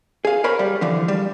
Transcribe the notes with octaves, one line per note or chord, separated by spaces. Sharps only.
G#4 F5
A#4 C5 C#5 B5
G3
D3 E3 F3
G3